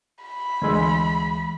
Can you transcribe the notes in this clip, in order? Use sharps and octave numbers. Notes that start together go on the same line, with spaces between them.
B5
D2 E3 G#3 C6 E6